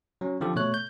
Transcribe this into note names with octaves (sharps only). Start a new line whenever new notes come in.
F#3 C#4
D3 F3 C4 G4 A4
B2 A3 C#5 F#6
G6